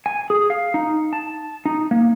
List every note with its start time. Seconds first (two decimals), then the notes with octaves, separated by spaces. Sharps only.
0.06 G#5
0.30 G#4
0.50 F5
0.74 D#4
1.13 A5
1.66 D#4
1.91 A#3